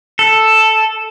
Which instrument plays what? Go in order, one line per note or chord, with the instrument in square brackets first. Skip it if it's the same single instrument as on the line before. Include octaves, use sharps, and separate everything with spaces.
[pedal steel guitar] A4